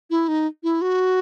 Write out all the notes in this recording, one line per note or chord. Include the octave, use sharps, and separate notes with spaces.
E4
D#4
E4
F#4